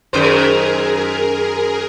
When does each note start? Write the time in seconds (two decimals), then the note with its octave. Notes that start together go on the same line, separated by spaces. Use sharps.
0.13 F#2 D#3 G#4 A#4 C5